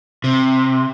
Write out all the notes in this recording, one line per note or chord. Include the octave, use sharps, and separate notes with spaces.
C3